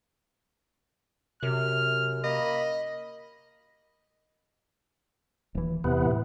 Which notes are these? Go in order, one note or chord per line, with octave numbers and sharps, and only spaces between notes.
F#2 C3 F6
A#3 D#5 B5
D#1 E3
E2 C3 E3 B3
A2